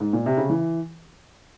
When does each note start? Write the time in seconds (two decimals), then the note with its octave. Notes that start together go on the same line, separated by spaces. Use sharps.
0.00 G#2
0.13 A#2
0.26 C3
0.37 C#3
0.50 E3